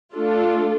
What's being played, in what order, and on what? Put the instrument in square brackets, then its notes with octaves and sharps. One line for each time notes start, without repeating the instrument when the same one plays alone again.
[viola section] A3 D4 F4 A4